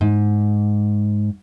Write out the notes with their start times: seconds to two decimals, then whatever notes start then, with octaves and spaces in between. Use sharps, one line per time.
0.01 G#2